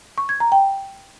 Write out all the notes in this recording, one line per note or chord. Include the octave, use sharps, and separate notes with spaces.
C#6
G#6
A#5
G5